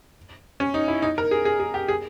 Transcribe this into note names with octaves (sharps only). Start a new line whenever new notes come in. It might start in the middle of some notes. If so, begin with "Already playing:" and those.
C#4
D#4
E4
D#4
A#4
G#4
G#4
G#4
G4
G#4